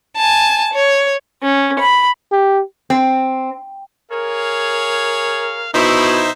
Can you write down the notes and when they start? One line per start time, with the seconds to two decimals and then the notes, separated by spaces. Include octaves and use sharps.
0.16 G#5 A5
0.74 C#5
1.41 C#4
1.78 B5
2.32 G4
2.90 C4
4.11 G#4 A#4 C#5 F5
5.74 B2 D#4 E4 C5 E5